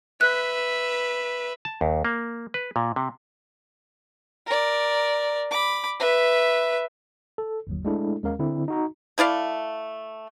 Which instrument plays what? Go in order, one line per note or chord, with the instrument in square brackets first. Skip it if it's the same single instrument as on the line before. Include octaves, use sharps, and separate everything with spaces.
[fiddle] B4 E5 [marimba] F#6
[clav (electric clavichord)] A5
D#2
A#3
B4
A#2
C3
[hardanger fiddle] A#4 D5
B5 D6
B4 E5
[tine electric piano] A4
G1 D#2 F#3
G#3 A3 D4 E4 A4
D#2 G#3 C#4 A#4 F5
D3 C4 E4
D#4 F#4 A#5
[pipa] A3 E4 D5 F5